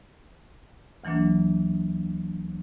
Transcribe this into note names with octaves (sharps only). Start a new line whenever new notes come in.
D2 E3 F#3 A#3 D4